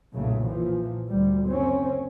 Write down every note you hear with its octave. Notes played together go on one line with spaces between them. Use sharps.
F#1 B1 A#2 C#3 A3
A#2 E3 F3
D2 G3
F#1 C4 C#4